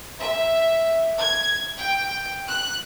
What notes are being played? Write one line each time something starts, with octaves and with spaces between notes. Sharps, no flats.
E5
G#6
G5
F#6